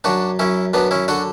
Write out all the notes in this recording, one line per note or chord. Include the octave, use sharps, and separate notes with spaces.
F#2 D4 F#4
F#2 C#4 E4
F#2 B3 D4
C#4 E4
D3 D4 F#4